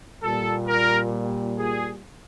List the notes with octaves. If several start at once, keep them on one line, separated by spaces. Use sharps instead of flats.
A#2 G3 A4
A#4
G#4